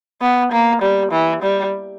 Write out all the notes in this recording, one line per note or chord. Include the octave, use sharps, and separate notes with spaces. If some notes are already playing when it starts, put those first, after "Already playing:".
B3
A#3
G3
E3
G3